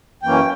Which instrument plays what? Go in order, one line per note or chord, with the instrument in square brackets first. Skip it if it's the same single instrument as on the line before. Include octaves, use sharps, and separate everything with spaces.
[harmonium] F#2 E3 A#3 C#4 G5